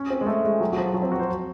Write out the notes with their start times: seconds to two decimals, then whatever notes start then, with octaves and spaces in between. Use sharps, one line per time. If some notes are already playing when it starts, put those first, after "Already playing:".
Already playing: C#4
0.10 C4
0.21 G#3
0.27 A3
0.44 G#3
0.60 F#3
0.73 F#3
0.78 F3
0.94 F#3
1.03 C4
1.12 F#4
1.19 C5